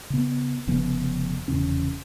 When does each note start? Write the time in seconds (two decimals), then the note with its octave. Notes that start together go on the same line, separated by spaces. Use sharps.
0.10 C#3 B3
0.67 F1 C#3 F3 B3
1.48 F1 E2 C#3 C#4